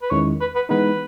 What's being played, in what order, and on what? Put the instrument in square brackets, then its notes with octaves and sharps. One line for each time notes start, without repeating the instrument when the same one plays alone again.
[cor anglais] B4
[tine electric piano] E2 D#3 G#3 C#4 E4 [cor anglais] C#5
[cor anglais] B4
B4
[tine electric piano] E3 G#3 B3 D#4 [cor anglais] B4